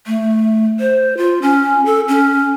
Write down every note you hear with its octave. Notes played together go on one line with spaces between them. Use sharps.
A3
C5
F4
C#4
A4
C#4